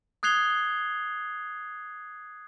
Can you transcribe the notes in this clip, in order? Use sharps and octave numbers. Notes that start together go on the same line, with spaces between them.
D#6 F#6 G#6 C7 F7 G7